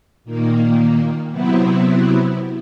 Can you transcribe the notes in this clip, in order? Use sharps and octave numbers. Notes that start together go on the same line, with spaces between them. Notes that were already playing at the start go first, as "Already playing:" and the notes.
A#2 D#3 A#3
C3 F#3 B3 C4 E4